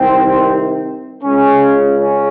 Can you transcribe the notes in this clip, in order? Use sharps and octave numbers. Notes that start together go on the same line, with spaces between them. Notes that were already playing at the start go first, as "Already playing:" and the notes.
Already playing: C2 C3 D#3 C4
C#2 C#3 G#3 C#4
C#4